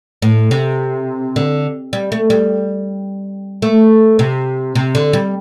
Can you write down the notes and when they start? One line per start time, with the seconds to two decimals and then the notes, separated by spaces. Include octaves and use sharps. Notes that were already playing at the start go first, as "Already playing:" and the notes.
0.22 A2
0.51 C3
1.36 D3
1.93 G3
2.12 A3
2.30 G3
3.62 A3
4.19 C3
4.75 C3
4.95 D3
5.13 G3